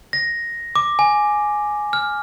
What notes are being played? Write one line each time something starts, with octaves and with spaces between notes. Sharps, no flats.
A#6
D6
G#5
F6